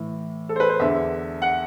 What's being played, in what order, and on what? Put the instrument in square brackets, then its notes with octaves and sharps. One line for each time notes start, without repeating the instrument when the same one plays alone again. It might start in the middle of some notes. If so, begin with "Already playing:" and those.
Already playing: [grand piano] A2 E3
A4
C5
B4
C5
E2 D3 E5
F#5